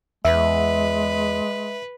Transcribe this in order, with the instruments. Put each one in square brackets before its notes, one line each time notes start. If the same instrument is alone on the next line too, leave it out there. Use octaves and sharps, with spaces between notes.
[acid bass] E2 [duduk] G#3 [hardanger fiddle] B4 [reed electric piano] E5